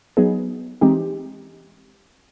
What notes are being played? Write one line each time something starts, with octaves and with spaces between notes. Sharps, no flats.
F#3 B3 D#4 G#4
E3 G#3 C4 D#4 G4